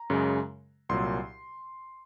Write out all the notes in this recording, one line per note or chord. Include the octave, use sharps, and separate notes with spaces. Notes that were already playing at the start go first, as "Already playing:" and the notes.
Already playing: A#5
F#2 C#3 G#3
C2 A#2 F#3 C6